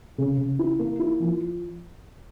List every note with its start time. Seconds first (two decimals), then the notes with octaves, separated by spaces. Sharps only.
0.18 C#3
0.38 C#3
0.59 E4
0.79 A#3
0.99 E4
1.20 F3